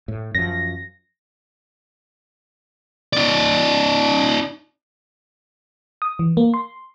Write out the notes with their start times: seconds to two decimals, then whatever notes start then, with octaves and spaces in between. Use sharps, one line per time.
0.08 A2
0.35 F#2 F3 A#6
3.13 D#4 D5
6.02 D#6
6.19 E3
6.37 A#3
6.54 C6